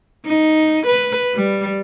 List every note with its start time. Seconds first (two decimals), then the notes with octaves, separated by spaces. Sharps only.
0.26 D#4
0.87 B4
1.35 G3